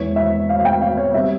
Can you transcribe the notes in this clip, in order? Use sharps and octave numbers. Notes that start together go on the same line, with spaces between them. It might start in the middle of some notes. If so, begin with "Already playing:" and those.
Already playing: E2 E3 G#3 C#5
E5
F5
F5
G5
F5
C#5
G3 C4 E5